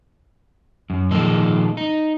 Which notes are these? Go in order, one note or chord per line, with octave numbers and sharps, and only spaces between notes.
F#2
A#2 D#3 F3 G#3 A4
D#4